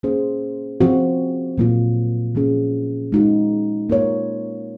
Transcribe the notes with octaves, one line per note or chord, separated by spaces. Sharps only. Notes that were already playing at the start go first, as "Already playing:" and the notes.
A#3 C#4 G#4 C5
F3 C4 F#4
A#2 F#3 A#3 F4
F3 A#3 C#4 G#4
G#3 D#4 F#4
A#3 F4 A#4 C#5